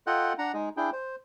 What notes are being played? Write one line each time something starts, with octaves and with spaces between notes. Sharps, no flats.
F4 A4 D#5 F#5 G5 F#6
D4 F#5 A#5
G#3 D#4 G#4
D4 E4 G#4 G5
C5